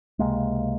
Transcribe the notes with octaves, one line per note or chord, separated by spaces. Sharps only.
C#2 C3 G#3 A#3